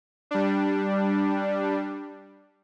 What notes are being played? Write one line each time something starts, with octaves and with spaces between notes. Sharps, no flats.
G3 D4